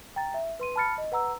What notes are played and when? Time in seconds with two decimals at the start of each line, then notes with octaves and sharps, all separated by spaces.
0.16 G5 A#5 A6
0.34 E5
0.60 B4 C6 D#7
0.76 A5 B5 F6 A6 C#7
0.98 D#5
1.12 B4 F#5 A#5 E6